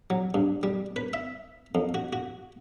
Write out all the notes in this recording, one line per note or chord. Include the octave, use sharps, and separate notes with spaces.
F#3
G2
G3
B4
E5
F2
F#4
F#4